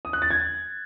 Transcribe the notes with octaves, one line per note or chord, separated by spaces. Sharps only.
D#6
F#6
A6
G#6